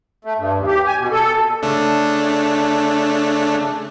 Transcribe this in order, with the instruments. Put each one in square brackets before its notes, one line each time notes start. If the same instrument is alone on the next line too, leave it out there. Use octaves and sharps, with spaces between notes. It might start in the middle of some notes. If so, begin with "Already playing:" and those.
[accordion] A3
G2
D#2
G4
G#5
B2
A4
[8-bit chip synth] C#3 A3 D4